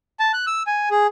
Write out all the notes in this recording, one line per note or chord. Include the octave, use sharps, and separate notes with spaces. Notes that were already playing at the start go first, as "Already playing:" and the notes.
A5
F#6
E6
G#5
G#4